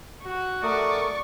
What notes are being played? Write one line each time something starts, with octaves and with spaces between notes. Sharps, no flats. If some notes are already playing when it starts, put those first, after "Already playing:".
F#4
A3 A#4 D5 C#6 D#6